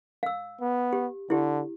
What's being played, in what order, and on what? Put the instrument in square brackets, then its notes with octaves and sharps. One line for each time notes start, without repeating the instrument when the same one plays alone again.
[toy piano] F5 E6
[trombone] B3
[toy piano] G4
[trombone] D3 [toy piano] E4 G4